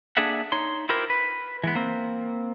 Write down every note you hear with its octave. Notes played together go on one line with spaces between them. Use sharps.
A#3 D4 G#4 A4 E5 F#5
D#4 C#5 C6
E4 F4 G4 A#4 C5
B4
E3 G#3 B3
A#3 C4